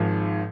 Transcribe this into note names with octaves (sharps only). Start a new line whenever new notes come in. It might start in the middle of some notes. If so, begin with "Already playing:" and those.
Already playing: G#1 G#2 F3